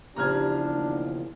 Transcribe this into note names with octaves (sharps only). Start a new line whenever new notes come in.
E2 C#3 F3 D4 G4 A#5 F6 G#6
D#2